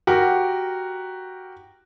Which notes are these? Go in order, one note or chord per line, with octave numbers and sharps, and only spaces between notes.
F#4 G4 A#4